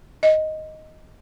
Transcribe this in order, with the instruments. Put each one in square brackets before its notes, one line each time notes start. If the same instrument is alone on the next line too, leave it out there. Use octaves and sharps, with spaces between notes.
[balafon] D#5